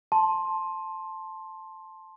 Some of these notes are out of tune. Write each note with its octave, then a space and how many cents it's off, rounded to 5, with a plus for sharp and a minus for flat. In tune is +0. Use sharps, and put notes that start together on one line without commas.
A5 -5 C6 +15